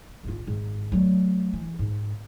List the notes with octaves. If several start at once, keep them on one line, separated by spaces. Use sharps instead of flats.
G#1 F4
G#1
F#3 A3
E3
G#2